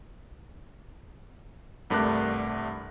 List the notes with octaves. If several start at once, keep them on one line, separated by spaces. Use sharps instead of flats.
C2 G2 A3 A#4 D6 F#6